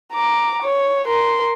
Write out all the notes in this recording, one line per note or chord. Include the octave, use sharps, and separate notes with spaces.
A#5 D6
C#5
A#4 C6